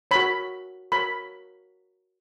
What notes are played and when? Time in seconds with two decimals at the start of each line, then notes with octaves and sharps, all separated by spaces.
0.11 F#4 A#4 C#5 B5
0.92 F#4 A#4 C#5 B5